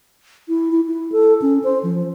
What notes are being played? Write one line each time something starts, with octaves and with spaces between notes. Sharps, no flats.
E4
E4
E4
A4
C#4
C5
F3